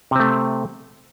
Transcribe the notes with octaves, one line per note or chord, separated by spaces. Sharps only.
C3 A3 C4